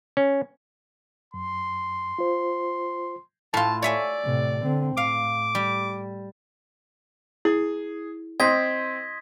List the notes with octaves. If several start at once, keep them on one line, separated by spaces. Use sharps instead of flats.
C#4
F#2 C6
F4 C5
A2 F4 A5
C#5 D5 E5 G#5
A2 C3
D3 C4
A2 F5 D6
G3
E4 G#4
C4 D#5 C6 G6 G#6 B6